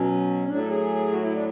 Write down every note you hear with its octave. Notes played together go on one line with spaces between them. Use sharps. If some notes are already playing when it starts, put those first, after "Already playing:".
Already playing: B2 F#3 C#4
A2 F#3 D4
A4
G#4
F#4
E4
D4